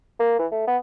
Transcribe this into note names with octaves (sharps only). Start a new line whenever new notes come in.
A#3
E3
A3
B3